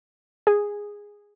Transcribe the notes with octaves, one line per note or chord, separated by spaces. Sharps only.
G#4